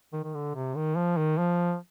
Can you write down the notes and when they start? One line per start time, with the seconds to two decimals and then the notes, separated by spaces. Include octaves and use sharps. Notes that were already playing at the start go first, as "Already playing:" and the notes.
0.13 D#3
0.24 D#3
0.34 D3
0.55 C3
0.76 D#3
0.96 F3
1.18 D#3
1.38 F3